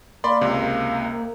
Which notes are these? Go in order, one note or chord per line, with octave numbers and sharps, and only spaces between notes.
A#3 D5 B5 C6
C#2 C3